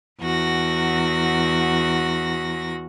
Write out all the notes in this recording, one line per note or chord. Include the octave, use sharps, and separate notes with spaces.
E2 F#4 A#6